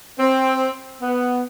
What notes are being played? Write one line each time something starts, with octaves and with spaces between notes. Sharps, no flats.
C4
B3